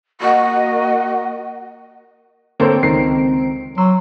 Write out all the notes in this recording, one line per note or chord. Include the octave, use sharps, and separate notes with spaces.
A#3 F#4 D#5
D3 A#3 C4 A4 C5 C#5 D7
C#2 D#3 A#5 C7
F#3 C6 E6